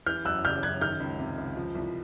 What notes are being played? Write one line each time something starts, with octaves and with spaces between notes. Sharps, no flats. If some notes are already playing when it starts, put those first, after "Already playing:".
E3 F6 G6
F#2 E6 F#6
C#3 F6 G6
F#2 F#6 G#6
D#3 F6 G6
C#2
C3
C#2
F3
C2